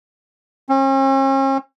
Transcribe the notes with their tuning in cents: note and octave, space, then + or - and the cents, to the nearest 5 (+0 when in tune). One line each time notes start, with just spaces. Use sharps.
C#4 -45